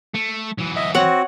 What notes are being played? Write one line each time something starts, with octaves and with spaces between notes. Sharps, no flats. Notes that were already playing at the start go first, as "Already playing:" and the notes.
A3
E3 F#3
D#5 E5
C4 F#4 C#5 F#5